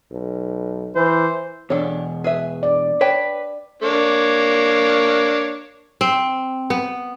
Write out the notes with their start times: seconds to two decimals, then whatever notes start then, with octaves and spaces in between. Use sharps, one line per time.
0.12 B1
0.96 E3 C5
1.70 E2 B2 D4 A4 C#5
2.24 G#4 B4 E5
2.63 D5
3.01 B4 C#5 G5 A5
3.82 A#3 D4 C#5
6.01 C4
6.70 B3